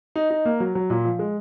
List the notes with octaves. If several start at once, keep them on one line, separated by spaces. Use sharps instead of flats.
D#4
D#4
A#3
F#3
F#3
A#2
F3
G#3